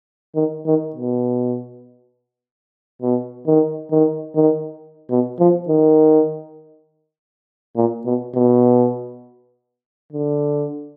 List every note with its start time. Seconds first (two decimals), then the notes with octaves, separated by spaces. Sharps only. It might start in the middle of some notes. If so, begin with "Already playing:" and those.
0.36 D#3
0.66 D#3
0.95 B2
3.02 B2
3.47 D#3
3.91 D#3
4.35 D#3
5.10 B2
5.39 F3
5.69 D#3
7.76 A#2
8.05 B2
8.35 B2
10.12 D3